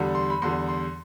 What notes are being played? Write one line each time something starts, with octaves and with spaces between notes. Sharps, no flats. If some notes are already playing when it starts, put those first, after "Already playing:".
Already playing: E2 D3 G3
C6
B5
E2 D3 G3 C6
C6